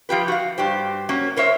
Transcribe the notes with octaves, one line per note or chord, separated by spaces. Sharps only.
F3 F4 G4 B4
F#4 F5
G2 G4 C5
F#3 A#3 C#4
A#4 C5 C#5 E5